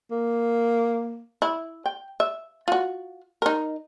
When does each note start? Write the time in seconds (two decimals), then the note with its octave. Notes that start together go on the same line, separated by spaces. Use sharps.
0.11 A#3
1.42 E4
1.86 G5
2.20 E5
2.68 F4 F#4
3.42 D#4 A#4